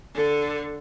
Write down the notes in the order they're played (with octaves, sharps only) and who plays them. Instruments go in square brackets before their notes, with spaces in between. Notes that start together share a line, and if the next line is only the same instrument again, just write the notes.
[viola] D3 A4